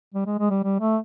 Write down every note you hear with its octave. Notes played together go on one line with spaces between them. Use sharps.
G3
G#3
G#3
G3
G3
A3